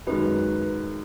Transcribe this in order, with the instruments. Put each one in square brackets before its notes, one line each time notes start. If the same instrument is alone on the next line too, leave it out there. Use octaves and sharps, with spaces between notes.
[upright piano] F#2 D#3 G#3 [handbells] B4